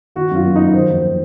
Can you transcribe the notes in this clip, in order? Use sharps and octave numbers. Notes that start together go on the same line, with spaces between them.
D#3 F#4
F#2 F4
A#3
A#3 D#4
D#3 C5
F2